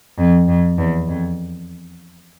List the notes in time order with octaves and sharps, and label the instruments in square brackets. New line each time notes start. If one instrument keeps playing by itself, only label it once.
[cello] F2
F2
E2
F2